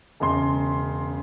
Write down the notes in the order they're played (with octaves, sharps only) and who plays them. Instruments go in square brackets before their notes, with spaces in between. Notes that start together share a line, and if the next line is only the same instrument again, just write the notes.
[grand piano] E1 C#3 C6